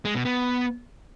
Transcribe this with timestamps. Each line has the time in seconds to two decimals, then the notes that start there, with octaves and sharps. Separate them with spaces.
0.05 G#3
0.15 B2
0.25 B3